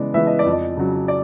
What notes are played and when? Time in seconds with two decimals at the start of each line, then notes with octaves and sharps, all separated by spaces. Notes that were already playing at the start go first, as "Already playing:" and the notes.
Already playing: C#3 E3 G#3 B3 D5
0.14 E3 G#3 B3 E5
0.27 D#5
0.39 D5
0.46 F2
0.51 D#5
0.77 C#3 F#3
1.08 D5